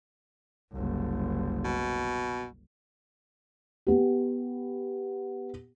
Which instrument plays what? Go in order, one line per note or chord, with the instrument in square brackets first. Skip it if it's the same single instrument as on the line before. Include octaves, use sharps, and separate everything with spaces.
[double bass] F#1 C2
[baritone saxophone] B2
[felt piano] B3 G4